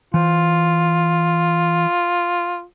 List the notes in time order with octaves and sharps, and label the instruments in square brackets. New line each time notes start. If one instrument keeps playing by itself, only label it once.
[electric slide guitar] E3 C5 [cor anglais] F4